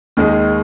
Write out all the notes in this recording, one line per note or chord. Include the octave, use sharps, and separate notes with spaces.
D#2 D#3 G#3 D#4 G#4